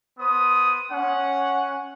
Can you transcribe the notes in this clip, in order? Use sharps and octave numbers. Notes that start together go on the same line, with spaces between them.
B3 C5 D#6
C#4 F#5